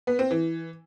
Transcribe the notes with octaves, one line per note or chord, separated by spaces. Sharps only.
B3
C4
E3